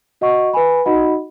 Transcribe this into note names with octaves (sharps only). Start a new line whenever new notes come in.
F#4 D#5 F#5 C#6
B4 G#5 B5
D#4 F#4 D#5 F#5 B5